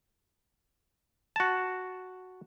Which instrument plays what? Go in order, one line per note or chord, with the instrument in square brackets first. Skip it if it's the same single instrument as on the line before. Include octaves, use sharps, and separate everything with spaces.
[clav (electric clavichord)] F#4 A5